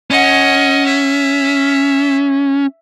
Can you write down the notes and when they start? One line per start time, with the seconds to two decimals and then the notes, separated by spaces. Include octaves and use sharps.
0.10 C#4 D#5 F#5
0.86 E5